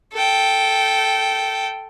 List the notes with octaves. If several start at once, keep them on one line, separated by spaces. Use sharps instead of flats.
A4 G5